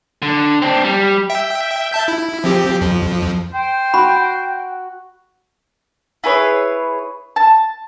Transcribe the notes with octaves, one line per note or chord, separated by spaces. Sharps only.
D3
C4 D4
G3
E5 G5
E5 A5 G6
E4
F3 C4 G4
F2 F3
C5 G5
F#4 B5
E4 G#4 B4 C#5
A5